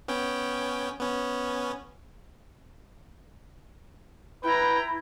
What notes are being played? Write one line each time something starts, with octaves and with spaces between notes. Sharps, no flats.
B3 C#4 G5
B3 C#4
E4 B4 G5 A#5